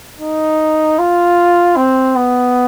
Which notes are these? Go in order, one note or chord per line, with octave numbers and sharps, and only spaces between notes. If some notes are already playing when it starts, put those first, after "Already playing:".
D#4
F4
C4
B3